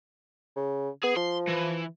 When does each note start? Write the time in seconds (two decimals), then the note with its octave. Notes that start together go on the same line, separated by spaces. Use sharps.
0.56 C#3
1.04 B3 G#4
1.17 F3 C6
1.48 E3